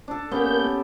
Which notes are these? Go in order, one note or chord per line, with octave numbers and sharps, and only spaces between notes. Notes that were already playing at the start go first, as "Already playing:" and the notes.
D4 A4
A#3 B3 C#4 G4 G6